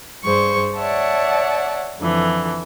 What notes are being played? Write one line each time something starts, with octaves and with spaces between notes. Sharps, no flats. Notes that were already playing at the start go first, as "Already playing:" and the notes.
G2 G#4 C5 C#6
C#5 D5 E5 F#5 A5
F2 D3 E3